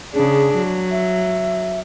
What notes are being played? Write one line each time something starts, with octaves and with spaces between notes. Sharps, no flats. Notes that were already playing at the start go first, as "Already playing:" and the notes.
C#3 D4 G#4
F#3
E5